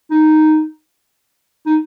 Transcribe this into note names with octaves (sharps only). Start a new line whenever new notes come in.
D#4
D#4